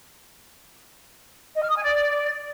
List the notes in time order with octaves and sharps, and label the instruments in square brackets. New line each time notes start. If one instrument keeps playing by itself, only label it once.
[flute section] D#5
F6
D#6
G#5
D5